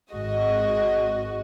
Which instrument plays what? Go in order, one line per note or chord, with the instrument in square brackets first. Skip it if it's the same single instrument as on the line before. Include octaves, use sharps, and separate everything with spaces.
[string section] G#1 G#3 F#4 D#5